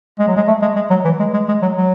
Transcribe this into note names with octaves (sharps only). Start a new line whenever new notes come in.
G#3
F#3
G#3
A3
G#3
G#3
F#3
E3
G#3
G#3
G#3
F#3
F#3